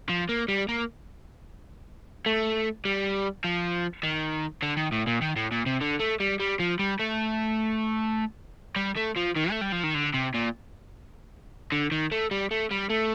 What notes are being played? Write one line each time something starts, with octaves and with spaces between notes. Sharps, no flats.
F3
A#3
G3
A#3
A3
G3
F3
D#3
D3
D#3
A2
A#2
D#3
A2
A#2
C3
D3
A3
G3
G3
F3
G3
A3
G3
A3
F3
D#3
A3
G3
F3
D#3
D3
C3
A#2
D3
D#3
A3
G3
A3
G3
A3